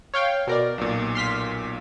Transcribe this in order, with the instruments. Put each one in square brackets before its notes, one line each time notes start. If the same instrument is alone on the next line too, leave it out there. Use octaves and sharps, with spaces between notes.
[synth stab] C#5 F5 G5
B2 A#4 D5
[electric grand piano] B1 A#2
[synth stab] C6 F6 B6